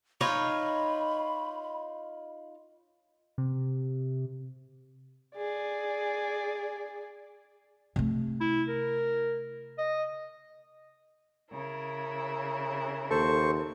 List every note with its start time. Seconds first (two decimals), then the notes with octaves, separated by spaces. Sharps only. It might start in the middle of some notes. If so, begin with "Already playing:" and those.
0.21 D#4 F4 C#5 B5
3.38 C3
5.36 G#4 D5
7.96 C3 A3
8.41 E4
8.68 A#4
9.78 D#5
11.51 C#3 E4 A#4
13.11 D#2 A4 C5 C#6